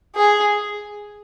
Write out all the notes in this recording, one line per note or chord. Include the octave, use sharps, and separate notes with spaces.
G#4